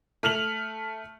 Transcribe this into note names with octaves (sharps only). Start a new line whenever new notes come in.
A3 F6 F7 F#7